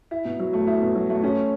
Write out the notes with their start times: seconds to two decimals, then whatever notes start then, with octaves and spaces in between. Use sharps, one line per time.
0.11 E4
0.25 B2
0.39 F#3
0.53 A3
0.67 E4
0.82 B2
0.95 F#3
1.10 A3
1.23 C#4